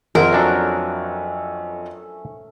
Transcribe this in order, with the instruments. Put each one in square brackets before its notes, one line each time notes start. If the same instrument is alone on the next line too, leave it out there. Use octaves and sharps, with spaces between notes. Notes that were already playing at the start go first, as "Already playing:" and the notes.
[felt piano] F2 F#5 [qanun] A#4 [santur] C5 E5 A#5
[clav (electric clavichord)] F#3 D4 F#4 [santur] A3 C#4